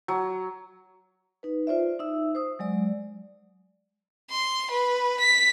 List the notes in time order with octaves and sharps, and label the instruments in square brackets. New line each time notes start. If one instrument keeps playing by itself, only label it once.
[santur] F#3
[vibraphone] D#4 B4
F4 C5 D5 E5
D#4 E5 E6
C5 D#6
F#3 G#3 D5
[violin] C6
B4
B6